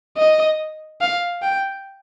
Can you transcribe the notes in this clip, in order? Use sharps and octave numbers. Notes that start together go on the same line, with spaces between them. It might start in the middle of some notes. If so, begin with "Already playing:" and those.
D#5
F5
G5